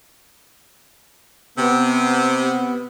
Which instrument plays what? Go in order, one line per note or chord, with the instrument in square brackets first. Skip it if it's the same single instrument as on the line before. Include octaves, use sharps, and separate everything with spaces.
[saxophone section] C3 [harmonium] B3